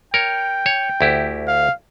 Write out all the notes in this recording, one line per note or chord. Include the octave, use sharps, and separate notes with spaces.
A#4 C#5 G5
C#5
D2 E4 G4
F5